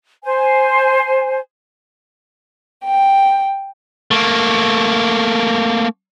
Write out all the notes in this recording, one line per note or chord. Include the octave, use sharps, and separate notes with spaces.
C5 G#5
G5
A3 A#3